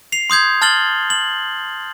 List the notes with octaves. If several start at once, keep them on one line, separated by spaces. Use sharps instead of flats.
C7 F7
C6 D#6 G6 G#6
A5 F6 A6 F#7 G7
F#7